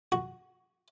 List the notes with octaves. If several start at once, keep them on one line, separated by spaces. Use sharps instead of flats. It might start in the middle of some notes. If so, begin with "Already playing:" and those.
F#4